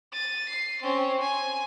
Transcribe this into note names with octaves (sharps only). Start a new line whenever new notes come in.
A6 D#7
C7
C4 C#4
G#5